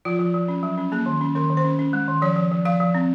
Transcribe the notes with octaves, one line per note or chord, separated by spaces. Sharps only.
F3 F4
F3
F3
C#4
F#3
C#4
A#3 G#4
D#3
C#4
D#3 A#4
D#3
C5
C#4
C#4
G#3
D#3
F3 C#5
F3
F3
F3 F5
F3
C4